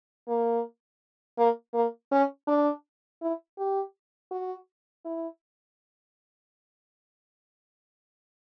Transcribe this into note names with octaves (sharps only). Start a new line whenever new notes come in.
A#3
A#3
A#3
C#4
D4
E4
G4
F#4
E4